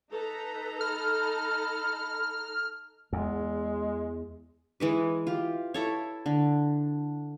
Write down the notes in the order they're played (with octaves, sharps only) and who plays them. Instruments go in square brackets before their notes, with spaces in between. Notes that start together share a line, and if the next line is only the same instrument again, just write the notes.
[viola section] D#4 A4 A#5 [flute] B4
[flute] B5 [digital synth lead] F6
[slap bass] E2 [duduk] G#3
[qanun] E3 G#3 B4
F4 G4
E4 A4 C#5
D3